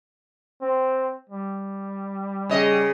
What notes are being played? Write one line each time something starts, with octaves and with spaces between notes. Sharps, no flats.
C4
G3
C#3 D#5